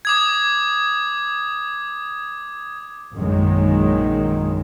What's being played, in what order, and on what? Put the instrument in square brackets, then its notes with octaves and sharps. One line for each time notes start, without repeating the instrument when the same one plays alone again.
[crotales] D6 D#6 G#6
[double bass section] A#1 F#2 D#3 G#3